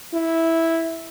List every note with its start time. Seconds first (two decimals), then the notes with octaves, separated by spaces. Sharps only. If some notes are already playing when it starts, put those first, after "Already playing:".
0.13 E4